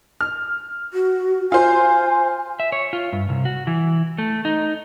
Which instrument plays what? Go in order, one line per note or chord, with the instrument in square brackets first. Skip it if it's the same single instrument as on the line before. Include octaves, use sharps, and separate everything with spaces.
[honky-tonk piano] F6
[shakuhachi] F#4
[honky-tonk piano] F4 C5 [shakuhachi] G#5
[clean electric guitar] E5
C#5
F4
G2
C2
F#4
E3
A3
D#4